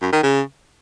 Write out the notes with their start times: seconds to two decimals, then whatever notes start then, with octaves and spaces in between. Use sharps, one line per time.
0.02 F#2
0.12 D#3
0.23 C#3